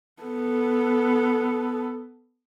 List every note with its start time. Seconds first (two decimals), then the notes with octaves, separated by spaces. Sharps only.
0.22 B3 A4